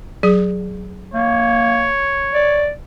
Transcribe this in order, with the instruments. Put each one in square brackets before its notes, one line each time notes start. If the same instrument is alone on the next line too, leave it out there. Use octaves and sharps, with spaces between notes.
[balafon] F#3 G#4
[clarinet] A#3 [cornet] C#5
[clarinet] D5